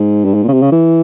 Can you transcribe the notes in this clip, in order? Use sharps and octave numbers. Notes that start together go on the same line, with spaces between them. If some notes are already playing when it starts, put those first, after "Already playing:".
Already playing: G#2
G2
G#2
A#2
C#3
C3
C#3
E3